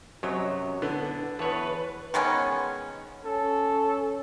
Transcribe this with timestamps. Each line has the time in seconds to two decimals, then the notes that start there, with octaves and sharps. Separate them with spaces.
0.23 F#2 C3 F#3 C#5 D#5
0.82 D3 B3
1.39 E2 B4 C#5 A5
2.14 D#3 G#3 B3 C#4
3.25 C#4 A4